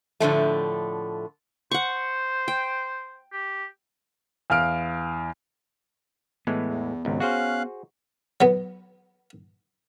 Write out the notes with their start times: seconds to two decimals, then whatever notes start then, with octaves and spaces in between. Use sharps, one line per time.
0.20 A2 D3 F3 A3
1.71 C5 F#5 C#6
2.48 G5
3.33 G4
4.50 E2 F5 F6 D7
6.47 A2 E3 G#3 B3
6.66 E2
7.05 G#1 C#2 F#3
7.20 C#4 F#4 G#4 C5 F5 F#6
8.41 F#3 B3